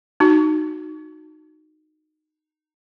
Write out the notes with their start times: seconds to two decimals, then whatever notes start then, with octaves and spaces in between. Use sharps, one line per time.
0.20 D#4 F#4